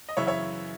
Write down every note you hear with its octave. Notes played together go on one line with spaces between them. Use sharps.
D#5
F#2 C#3 E3 C#5 E5
C#5 E5